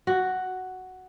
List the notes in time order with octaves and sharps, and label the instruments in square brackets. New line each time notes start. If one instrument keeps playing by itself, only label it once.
[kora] F#4